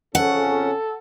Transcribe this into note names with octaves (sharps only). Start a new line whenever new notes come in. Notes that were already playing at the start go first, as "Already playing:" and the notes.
F2 C#3 C#4 A4 F#5